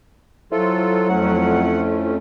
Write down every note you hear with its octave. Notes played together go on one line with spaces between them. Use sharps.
F#3 E4 F4 A4 C5
F2 A3 C#4 F#5